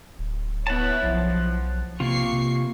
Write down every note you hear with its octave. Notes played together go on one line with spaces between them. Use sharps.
D1
B3 E4 C#5 F#5 A5
B1 F3
C3 A#3 C4 F4 C#6 C7
C3